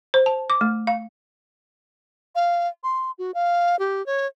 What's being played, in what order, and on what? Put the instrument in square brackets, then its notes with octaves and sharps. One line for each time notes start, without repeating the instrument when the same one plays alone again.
[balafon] C5
A5
D6
A3
F5
[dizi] F5
C6
F#4
F5
G4
C#5